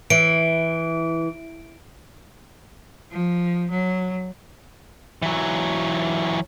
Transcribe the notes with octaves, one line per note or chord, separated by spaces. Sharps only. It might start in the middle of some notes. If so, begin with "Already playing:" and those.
E3 D7
F3
F#3
E3 F#3